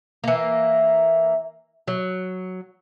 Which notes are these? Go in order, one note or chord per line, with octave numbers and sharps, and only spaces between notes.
E3 A#3
F#3